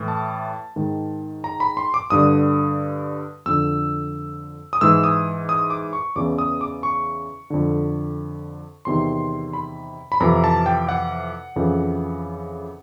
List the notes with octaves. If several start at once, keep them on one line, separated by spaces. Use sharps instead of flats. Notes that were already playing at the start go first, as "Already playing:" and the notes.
Already playing: A2 E3
A5
G#2 D#3
A#5
B5
C6
D6
G2 D3 D#6
F2 D3 E6
D#6
G#2 E3 E6
D#6
D#6
D6
C#6
E2 C#3 E3 D6
D#6
D6
C#6
F2 D3
E2 C3 D#3 C6
B5
B5
F2 C3 E3 A#5
A5
G5
F#5
F2 C#3 E3